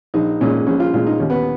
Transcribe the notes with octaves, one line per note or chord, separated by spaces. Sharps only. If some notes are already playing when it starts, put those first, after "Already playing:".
A#1 D#4
A#2 G#3 C#4
A#1 C#4
F4
A#2 G#3 F4
D#4
D#2 C#4
B3